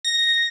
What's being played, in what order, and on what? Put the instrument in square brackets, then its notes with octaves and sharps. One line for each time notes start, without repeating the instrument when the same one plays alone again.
[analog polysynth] A#6